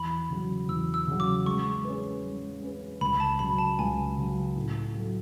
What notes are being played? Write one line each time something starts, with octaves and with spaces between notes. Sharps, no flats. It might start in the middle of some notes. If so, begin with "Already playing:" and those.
Already playing: E2 B5
C#3 F#3
E2 E6
E6
C#3 F#3
D6
G#3 C#6
C#4 G#4 B4
G#3
C#4 G#4 B4
C#2 B5
A5
C#3 F#3 B5
A5
C#2 G#5
C#3 F#3
A2
F#3 A3